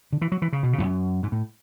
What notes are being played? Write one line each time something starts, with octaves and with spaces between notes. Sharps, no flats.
D3
E3
F#3
E3
C#3
B2
C#3
E2
F#2
G#2
A2